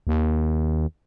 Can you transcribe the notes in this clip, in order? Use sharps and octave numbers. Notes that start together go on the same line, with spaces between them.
D#2